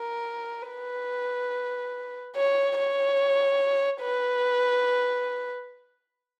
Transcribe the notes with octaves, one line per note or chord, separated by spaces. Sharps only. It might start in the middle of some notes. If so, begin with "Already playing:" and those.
Already playing: A#4
B4
C#5
C#5
B4